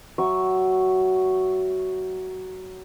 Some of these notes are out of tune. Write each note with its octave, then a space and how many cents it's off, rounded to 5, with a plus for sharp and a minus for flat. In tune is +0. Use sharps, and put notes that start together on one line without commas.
F#3 +15 E5 +0 C#6 +0